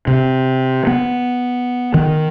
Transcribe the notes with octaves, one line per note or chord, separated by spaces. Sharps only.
C3
B3
D#3